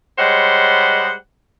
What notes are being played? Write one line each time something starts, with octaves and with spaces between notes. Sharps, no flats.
G3 G#3 C5 C#5 F#5